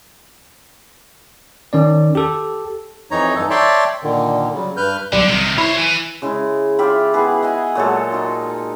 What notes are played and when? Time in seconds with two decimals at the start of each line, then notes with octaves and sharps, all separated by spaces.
1.73 D#3 C#4 D5
2.15 G4 A4
3.11 F2 E3 D#4 C#5 A#5
3.35 G2 E3 D#4 A4
3.50 C#5 D5 E5 G5 A5 C6
4.03 A#2 D3 D#3
4.54 C#3 F#3 G3
4.77 G2 B4 F6 G6
5.12 B1 D3 G3
5.27 C3 D#3
5.58 E4 C5 C#5
5.78 B4 G#5
6.22 C#3 G#3 E4
6.79 F4 G4 E5 B5
7.13 B3 E4 G#4 B4
7.42 D#5 E5 F#5 G#5
7.75 A#2 F#3 G#3 A4
8.12 D#4 F4